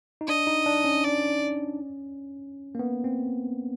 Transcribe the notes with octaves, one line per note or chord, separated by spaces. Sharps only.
D#4
D4 D#5
D#4
D4
C#4
D5
A#3
B3
C4